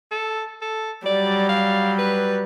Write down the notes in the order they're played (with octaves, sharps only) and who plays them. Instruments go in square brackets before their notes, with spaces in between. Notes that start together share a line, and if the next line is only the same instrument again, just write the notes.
[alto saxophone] A4
A4
[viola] F#3 G3 [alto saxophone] D5
[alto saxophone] F5
B4